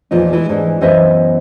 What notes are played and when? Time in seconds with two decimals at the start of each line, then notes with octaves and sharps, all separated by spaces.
0.11 E2 A#2 F3 D#4
0.33 E3 G#3
0.49 G#2 E3 G#3 D4
0.81 F#2 E3 B3 C5 D#5 E5